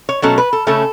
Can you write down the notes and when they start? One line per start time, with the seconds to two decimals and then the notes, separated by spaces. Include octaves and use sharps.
0.09 C#5
0.22 B2 F#3 A3 C#4 A4
0.38 B4
0.53 A4
0.67 C#3 A3 C#4 A4